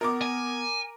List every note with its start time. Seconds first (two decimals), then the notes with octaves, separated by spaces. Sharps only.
0.01 B3 A#4 D6
0.22 G#5